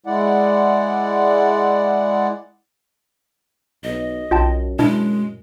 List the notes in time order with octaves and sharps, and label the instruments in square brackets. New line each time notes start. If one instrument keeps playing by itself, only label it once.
[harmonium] G#3 E4 D5 F#5
[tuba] B1 [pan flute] D#5
[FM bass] B1 [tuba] F#2 [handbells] F4 G5 A5
[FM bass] B2 [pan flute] G#3 [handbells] D4 E4